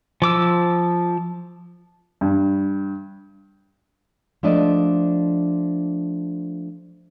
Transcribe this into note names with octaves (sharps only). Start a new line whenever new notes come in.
F3 D6 E6
G2
F3 A3 D4 D5 D#5